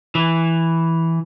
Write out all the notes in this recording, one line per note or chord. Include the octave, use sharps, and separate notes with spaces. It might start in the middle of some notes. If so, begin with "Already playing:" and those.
E3